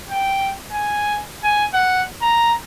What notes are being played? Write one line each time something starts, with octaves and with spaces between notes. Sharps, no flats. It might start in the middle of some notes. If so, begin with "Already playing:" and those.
G5
G#5
G#5
F#5
A#5